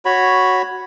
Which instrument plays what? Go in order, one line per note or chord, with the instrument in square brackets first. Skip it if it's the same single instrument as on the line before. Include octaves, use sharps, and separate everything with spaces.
[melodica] F#4 C#5 B5